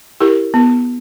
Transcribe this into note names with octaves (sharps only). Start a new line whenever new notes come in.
E4 G4 A#4
B3